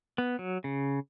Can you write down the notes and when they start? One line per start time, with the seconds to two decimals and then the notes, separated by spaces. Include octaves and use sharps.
0.18 B3
0.39 F#3
0.64 C#3